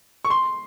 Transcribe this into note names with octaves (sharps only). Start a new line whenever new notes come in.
C#6
C6